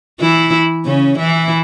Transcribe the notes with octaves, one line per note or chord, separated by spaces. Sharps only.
E3 E4
C#3 C#4
E3 E4